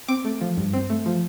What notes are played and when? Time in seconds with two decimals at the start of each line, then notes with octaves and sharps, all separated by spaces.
0.08 C4 D6
0.25 A3
0.41 F3
0.57 G2
0.73 C4
0.90 A3
1.06 F3